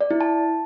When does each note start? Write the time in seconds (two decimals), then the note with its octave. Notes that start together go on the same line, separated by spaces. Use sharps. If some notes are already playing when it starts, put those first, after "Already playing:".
0.01 D5
0.11 E4
0.21 A5